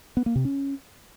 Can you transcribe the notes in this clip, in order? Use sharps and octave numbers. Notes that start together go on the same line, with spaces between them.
B3
A#3
C3
C#4